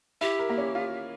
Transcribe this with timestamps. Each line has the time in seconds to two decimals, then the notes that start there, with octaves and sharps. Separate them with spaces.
0.21 E4 G4
0.39 A#4
0.49 A#3
0.58 C#4
0.75 F4